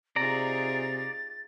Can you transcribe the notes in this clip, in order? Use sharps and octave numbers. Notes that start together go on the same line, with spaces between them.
C3 D#4 F4 G#4 D5 A#5 A6